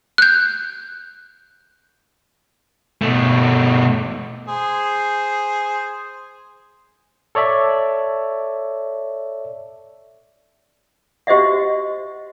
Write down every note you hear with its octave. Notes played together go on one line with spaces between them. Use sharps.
F#6 G6
B2 A3
G#4 C5
A4 C#5 D5 E5
F#4 G4 C5 D#5 E5 F#5